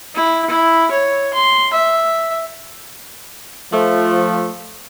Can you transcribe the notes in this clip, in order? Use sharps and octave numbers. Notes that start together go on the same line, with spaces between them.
E4
E4
C#5
C6
E5
F3 A3